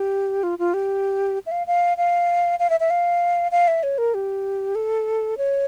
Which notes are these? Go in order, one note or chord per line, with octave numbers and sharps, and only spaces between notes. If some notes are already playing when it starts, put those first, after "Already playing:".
Already playing: G4
F4
F4
G4
E5
F5
F5
F5
F5
E5
E5
F5
F5
E5
C#5
A#4
G4
A4
C#5